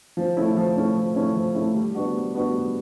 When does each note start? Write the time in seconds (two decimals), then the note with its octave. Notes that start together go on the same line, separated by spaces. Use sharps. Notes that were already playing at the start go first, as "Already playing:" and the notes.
0.17 F3
0.37 A3 C#4 E4
0.57 F3
0.76 A3 C#4 E4
0.96 F3
1.16 A3 C#4 E4
1.35 F3
1.54 A3 C#4 E4
1.74 G3
1.95 B3 D4 F#4
2.14 G3
2.34 B3 D4 F#4
2.54 G3